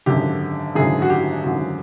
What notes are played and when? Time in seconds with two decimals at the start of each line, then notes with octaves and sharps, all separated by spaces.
0.06 G#1 F#2 D3 G4
0.75 G#1 F#2 D3 G#4
1.02 F#4
1.10 G4
1.44 G#1 F#2 D3 F#4